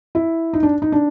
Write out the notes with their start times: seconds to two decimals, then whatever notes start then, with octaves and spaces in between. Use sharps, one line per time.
0.15 E4
0.53 D#4
0.63 D4
0.82 D#4
0.92 D4